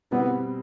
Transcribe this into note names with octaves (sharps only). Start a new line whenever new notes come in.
B2 G3 B3 C4 E4